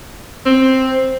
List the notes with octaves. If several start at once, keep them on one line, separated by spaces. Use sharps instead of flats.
C4